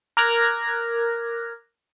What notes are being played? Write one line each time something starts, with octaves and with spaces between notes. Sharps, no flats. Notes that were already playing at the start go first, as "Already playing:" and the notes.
A#4 D6 F6 F#6 G#6 A#6